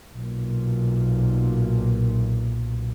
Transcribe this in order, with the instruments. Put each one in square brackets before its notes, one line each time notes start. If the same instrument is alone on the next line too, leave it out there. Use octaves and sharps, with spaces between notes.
[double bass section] B1 A#2